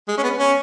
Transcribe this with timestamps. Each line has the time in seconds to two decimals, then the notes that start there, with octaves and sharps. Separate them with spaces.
0.08 G#3
0.17 C#4
0.23 B3
0.38 C#4